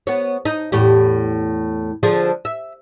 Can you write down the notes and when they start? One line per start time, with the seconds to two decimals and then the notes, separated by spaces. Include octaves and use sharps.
0.07 B3 C#5
0.45 D#4
0.72 E2 A2 G4
2.03 D3 F3 G#4
2.45 E5